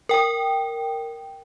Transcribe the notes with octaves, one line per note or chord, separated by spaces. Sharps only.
A#4 G5